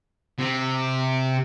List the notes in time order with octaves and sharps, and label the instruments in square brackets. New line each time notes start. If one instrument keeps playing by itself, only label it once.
[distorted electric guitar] C3